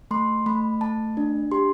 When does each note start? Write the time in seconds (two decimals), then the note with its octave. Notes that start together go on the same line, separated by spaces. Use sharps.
0.11 A3 C6
0.46 A3 B5
0.81 A3 A5
1.17 D4
1.52 G4 C6